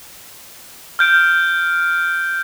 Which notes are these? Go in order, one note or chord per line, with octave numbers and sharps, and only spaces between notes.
F6 G6 D7